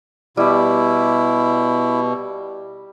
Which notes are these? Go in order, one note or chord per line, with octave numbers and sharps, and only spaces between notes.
B2 G3 E4 G4